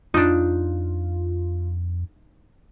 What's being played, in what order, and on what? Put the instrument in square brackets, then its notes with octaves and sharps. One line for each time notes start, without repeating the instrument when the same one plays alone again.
[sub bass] F2 [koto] D4 D#4 [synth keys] F4